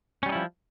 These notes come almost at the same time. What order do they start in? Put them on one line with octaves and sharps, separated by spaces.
C#4 G3 D#4 E4 F3